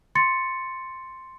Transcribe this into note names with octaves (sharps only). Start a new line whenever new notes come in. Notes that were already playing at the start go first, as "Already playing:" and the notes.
C6 A6 C#7